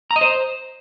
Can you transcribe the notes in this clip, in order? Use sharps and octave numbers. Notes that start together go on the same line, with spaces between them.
A#5
D#5
C5